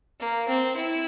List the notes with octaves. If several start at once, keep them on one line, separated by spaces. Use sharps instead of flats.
A#3
C4
E4